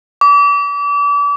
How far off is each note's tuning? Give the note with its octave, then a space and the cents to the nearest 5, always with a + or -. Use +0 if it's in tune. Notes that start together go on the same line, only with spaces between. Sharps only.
D6 -35